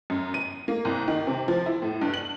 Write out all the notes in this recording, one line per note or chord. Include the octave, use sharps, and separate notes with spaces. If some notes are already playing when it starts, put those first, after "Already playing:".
F#2
D#7
A#3
C2
D#3
C3
F3
E4
A2
G2
F#7